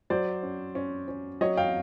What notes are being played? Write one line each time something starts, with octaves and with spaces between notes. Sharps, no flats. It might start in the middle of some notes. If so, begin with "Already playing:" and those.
F#3 C5 D5
C#4
C#4
C#4
F#3 C#5 D#5
F5 G5